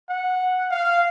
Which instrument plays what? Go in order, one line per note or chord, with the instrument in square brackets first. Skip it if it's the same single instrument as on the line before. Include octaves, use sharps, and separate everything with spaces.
[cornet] F#5
F5